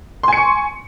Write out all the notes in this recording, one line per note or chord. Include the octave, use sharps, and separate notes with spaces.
G#5 C6 C#6 C#7